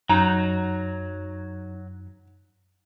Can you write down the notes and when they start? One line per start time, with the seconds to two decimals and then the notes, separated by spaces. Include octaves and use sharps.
0.10 F#2 F#3 D#4 A#5